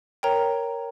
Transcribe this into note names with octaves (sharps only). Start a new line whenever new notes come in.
A#4 C#5 G5 A#5